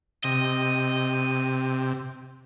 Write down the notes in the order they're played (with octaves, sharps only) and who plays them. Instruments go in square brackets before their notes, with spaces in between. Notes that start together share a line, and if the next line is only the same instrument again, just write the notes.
[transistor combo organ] C3 [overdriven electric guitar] D#5